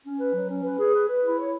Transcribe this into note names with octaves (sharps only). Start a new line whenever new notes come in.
C#4
B4
F#3
C#4
B4
G#4
B4
B4
E4
C#5